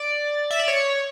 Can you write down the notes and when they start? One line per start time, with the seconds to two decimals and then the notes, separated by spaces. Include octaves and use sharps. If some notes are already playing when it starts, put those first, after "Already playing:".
Already playing: D5
0.51 E5
0.59 D5
0.68 C#5